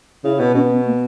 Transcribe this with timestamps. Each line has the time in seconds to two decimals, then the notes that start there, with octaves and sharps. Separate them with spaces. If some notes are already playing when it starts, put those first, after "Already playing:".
0.24 C#3 E4
0.39 B2
0.54 B2 C#4
0.70 B3
0.86 A#3